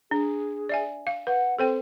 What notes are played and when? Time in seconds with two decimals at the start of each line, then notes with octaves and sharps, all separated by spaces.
0.11 D4 G#4
0.69 D5 E5 G#5
1.07 F5
1.27 B4 F#5
1.59 C4 A4 C5 G5